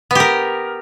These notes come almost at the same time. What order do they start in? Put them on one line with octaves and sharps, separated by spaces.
B3 G4 A#4